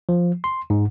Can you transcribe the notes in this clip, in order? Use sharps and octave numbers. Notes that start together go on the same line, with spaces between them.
F3
C6
G#2